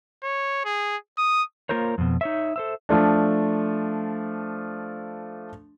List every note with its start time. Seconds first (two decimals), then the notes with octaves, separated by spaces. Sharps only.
0.24 C#5
0.65 G#4
1.18 D#6
1.69 A#3 F4 A#4 C5 C#5
1.98 F2 B2
2.21 D#4 C#5 E5
2.56 A4 C5 E5
2.89 F3 A3 D4